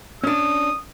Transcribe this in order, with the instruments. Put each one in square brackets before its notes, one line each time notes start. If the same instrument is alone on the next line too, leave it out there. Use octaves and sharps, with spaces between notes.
[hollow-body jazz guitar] C#4 D4 [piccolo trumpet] D#6